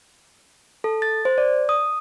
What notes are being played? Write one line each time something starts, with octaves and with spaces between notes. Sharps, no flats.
A4
A6
C5
D5
D#6